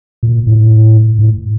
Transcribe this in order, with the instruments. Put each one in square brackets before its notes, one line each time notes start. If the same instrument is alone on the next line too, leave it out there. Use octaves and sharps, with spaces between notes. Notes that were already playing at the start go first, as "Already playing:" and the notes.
[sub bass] A#2
A2
A2